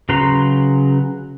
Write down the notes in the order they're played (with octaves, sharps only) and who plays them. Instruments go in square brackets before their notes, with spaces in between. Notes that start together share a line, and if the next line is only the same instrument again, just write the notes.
[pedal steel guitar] C#3 F#3 B4 A#5 C6